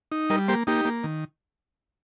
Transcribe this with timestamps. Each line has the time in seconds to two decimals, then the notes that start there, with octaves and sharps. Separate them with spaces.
0.12 D#4
0.30 G3 A#4 D#5
0.48 A#3 G4 C5
0.67 A#3 D#4 G4
0.85 A#3
1.04 D#3